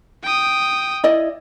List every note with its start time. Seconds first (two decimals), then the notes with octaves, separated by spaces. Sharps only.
0.23 G5 D#6
1.04 E4 D5 D#5